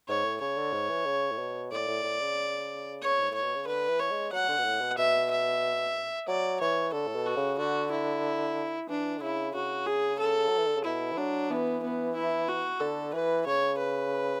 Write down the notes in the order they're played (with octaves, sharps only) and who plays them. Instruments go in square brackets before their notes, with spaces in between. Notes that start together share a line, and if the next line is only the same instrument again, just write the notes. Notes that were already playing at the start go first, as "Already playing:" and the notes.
[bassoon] G#2 [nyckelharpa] C#5
[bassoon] A2
[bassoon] C#3 [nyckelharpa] C#5
[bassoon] D3
G#2
E3
C#3
A2
B2
[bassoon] A2 [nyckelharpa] D5
[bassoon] A2
A2
C#3
[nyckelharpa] C#5
[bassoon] G#2
[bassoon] A2 [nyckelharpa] C#5
[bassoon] B2
C#3
[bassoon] D3 [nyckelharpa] B4
[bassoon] E3
[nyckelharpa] C#5
[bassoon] G#3
[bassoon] F#3 [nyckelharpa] F#5
[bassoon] D3
B2
A2
B2
[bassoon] B2 [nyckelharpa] E5
[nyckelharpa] E5
[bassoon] F#3 [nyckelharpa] D5
[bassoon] E3 [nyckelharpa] C#5
[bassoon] D3 [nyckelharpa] A4
[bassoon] A2
B2
[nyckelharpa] F#4
[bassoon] C#3
[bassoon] D3 [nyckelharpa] F#4
[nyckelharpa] E4
[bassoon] E3 [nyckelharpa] D4
[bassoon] D3
[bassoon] C#3 [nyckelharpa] E4
[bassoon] C#3 [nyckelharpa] F#4
[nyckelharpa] G#4
A4
[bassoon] F#3
E3
D3
C#3
[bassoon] B2 [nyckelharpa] E4
[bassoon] E3
[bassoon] F#3 [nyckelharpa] D4
[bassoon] E3 [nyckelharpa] B3
[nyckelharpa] B3
E4
F#4
[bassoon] D3 [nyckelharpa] A4
[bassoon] E3 [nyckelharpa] B4
[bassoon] C#3 [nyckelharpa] C#5
[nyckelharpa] B4